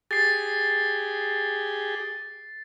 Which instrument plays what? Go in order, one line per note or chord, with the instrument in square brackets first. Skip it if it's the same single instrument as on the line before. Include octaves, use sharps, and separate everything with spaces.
[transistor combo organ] G4 G#4 [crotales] A6 C7